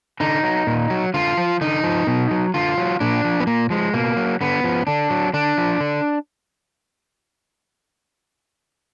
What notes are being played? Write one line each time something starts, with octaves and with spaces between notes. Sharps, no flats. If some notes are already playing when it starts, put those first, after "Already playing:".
D3 D#4
F#3
A#2
F#3
D3 F4
F3
D3 D#4
F3
B2
F#3
D3 F4
F#3
A#2 D4
F3
B3
A#2 A#3
F3 G#3
B2 A#3
F#3
D3 B3
F3
D3 D4
F#3
D3 D4
F3
D3